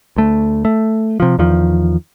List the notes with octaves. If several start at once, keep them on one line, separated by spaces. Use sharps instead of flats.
D2 A3
A3
C3 F3
E2 D#3 F3